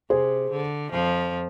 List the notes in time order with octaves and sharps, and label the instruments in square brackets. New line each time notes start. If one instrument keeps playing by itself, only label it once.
[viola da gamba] C3 [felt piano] G#4 C5
[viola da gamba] D3
F2 F3